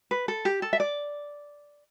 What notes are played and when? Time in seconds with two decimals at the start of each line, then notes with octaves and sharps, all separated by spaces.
0.11 B4
0.28 A4
0.45 G4
0.62 A4
0.73 E5
0.80 D5